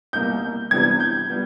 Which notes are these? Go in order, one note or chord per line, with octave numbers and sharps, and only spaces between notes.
C2 B2 G3 A#3 G6
C3 E3 G3 B3 D4 G#6
G6
G3 B3